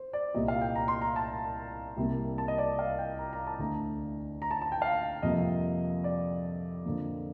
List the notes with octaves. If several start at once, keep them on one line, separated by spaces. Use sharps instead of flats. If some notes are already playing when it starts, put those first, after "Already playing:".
Already playing: C5
D5
C2 A#2 G3 A#3 D#5
F5
G5
A#5
C6
A#5
A5
C2 C3 G3 A#3
A5
D#5
D5
F5
G5
A#5
A#5
A5
D2 D3 A3 A#5
A#5
A5
A5
G5
F5
F2 C3 G3 A#3 D#5
D5
F2 D3 F3 A#3